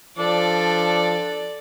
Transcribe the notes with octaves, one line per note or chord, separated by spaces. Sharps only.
F3 D4 A4 D5